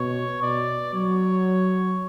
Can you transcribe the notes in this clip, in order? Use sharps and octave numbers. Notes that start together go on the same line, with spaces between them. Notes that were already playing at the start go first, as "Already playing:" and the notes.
Already playing: B2 C#5
B2 D5
F#3 C#5